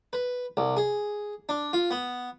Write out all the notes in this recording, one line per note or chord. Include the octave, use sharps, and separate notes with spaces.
B4
C2
G#4
D4
F4
B3